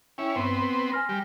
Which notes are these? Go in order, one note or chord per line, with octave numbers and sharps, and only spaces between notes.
C#4 E4 G5
G2 B3 C4 B5
B4
G#5 F6 A#6
G3